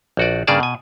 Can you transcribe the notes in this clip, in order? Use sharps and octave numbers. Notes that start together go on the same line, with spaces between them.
A#1 F#4 D5
G2 C#3 A#3 G#4 D5 A5
B2 G#5